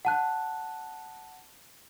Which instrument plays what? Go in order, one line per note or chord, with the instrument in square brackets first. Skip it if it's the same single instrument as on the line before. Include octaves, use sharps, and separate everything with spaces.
[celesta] F#5 A5 F#6